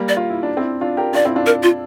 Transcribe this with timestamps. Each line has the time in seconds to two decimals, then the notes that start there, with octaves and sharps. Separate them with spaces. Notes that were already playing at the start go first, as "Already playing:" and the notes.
Already playing: G3 A#3
0.09 D5
0.17 F4
0.30 E4
0.43 D4
0.57 C4 E4
0.81 D4 F4
0.97 G4 A#4
1.14 D4 F4 D5
1.25 C4 E4
1.36 D4 F4
1.46 A#4
1.63 F4